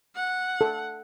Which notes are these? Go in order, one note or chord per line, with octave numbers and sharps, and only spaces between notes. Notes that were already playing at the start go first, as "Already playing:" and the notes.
F#5
A4